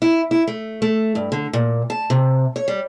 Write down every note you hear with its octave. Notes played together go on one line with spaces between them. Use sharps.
E4
E4
A3
A3
G2
D3
A#2
A5
C3
C#5
G3